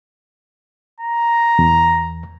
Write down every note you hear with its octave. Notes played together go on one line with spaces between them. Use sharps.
A#5
E2